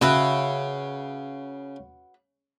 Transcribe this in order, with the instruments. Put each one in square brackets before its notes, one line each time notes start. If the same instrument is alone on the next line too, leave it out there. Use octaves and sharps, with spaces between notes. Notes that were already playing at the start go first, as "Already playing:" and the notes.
[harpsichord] C#3 [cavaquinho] F#4 B4 E5